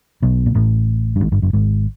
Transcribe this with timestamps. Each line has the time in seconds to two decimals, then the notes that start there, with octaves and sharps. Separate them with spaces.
0.22 B1 B2
0.46 A#2
0.55 A1 A2
1.16 G2
1.20 G#1 G#2
1.32 G1 G2
1.42 F#1 F#2
1.53 G#1 G#2